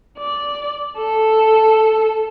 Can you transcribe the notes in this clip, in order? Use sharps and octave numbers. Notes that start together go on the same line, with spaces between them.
D5
A4